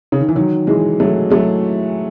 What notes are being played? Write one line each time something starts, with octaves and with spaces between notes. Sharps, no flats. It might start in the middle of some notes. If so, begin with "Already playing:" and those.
C#3
D#3
E3
D#3 F#3
E3 G#3
F#3 A3
F#3 A3